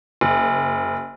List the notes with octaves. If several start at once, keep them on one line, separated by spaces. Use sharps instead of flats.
F#1